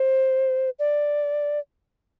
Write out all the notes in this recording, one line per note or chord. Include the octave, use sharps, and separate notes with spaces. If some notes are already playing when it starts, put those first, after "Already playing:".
Already playing: C5
D5